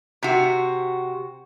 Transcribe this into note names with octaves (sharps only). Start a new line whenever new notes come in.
C3 F#4